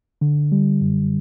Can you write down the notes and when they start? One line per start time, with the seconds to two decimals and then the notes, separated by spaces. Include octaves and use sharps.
0.21 D3
0.52 G3
0.81 F#2